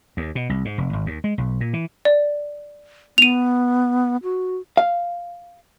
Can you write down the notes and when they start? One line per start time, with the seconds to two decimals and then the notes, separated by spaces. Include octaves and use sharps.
0.17 D#2
0.35 B2
0.49 C2
0.65 G#2
0.78 F1
0.93 G#1
1.06 D#2
1.24 G#3
1.38 B1
1.61 A#2
1.73 E3
2.05 D5
3.18 B3 D#7 F7
4.23 F#4
4.77 F5